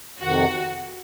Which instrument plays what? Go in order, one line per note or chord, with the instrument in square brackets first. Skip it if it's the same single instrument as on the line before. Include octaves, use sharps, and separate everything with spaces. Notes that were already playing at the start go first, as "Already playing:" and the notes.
[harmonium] F2 C3 D#3 [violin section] F#4